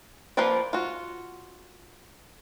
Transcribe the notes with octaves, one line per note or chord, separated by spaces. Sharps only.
F3 A#3 F4 B4 D5
F4 F#4